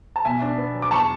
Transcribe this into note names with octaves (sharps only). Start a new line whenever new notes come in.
A5
B2 E5 G#5
D4
B3
F#3
D6
E2 A5 C#6